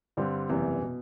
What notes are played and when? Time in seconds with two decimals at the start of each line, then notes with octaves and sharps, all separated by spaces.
0.17 G2 D3 G3 C4
0.49 F#1 E2 C3 E3 G3
0.82 B2